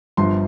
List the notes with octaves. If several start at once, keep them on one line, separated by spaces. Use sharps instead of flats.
G1 G2 F3 C6